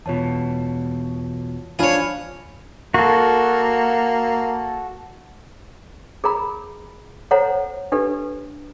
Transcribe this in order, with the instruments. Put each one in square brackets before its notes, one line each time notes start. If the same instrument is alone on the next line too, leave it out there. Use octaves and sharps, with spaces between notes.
[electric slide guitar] E2 B2 [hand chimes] F4 C#5 A5
[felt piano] F3 D4 [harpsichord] G#4 C#5 [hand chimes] F5 B5 F6
[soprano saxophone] A#3 [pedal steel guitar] F#4 A4
[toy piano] G#4 A#4 A#5 B5
A4 C5 C#5 F#5 A#5
D4 G4 A4 B4